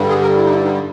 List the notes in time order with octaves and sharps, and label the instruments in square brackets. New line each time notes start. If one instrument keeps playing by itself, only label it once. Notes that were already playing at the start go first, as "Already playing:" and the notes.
Already playing: [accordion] G2 D3 G3
G#4
A#4
E4
D#4
E4
D#4